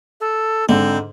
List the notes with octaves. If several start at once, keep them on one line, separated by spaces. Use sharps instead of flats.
A4
G#2 D3 C4